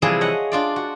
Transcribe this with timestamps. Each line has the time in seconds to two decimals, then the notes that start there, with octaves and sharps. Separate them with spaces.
0.02 C3 E3 F3 G3 G#4 A5
0.21 C#5 D#5 F#5
0.52 D4 F4 D5
0.76 F#4